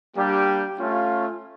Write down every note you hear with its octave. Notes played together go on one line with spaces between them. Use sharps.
G3 A#3 D4 G4
A3 C#4 F4